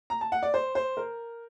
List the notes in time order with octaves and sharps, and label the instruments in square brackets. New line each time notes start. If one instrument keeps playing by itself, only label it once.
[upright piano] A#5
A5
F#5
D5
C5
C5
A#4